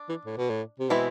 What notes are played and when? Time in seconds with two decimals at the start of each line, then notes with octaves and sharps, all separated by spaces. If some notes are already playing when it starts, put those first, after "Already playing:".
Already playing: D4
0.10 E3
0.26 A2
0.38 B2
0.50 A2
0.80 C3
0.90 B2 E3 G#3 C4 E4